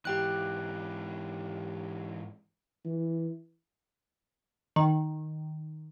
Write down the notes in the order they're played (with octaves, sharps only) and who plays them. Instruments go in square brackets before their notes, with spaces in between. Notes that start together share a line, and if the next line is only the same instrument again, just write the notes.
[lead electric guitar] G#2 E3 [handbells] G4 G5 F#6
[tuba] E3
[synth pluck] D#3